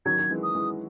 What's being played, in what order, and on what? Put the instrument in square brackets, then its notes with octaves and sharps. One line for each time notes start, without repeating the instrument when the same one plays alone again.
[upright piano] D#3 F#3 [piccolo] G#6
[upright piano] F#3
E3 G#3
[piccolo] D#6
[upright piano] E3 G#3